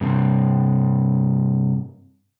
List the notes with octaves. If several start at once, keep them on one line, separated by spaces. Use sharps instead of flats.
G2 C3